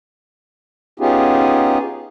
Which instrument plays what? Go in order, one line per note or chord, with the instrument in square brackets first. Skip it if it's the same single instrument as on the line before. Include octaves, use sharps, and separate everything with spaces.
[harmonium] B3 C#4 D#4 F4 G4 G#4